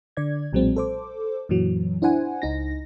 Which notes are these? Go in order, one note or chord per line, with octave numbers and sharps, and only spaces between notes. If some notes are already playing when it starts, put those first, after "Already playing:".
D3 D5 G#6
B1 A#2 F#3 G#3 C4
A4 C5 D6
F#2 A#2 E3 F#3
D4 E4 C5 F#5 G#5
C#2 D#4 A#6